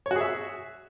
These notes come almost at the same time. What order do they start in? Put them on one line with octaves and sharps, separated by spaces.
C#5 F#4 G#4 E5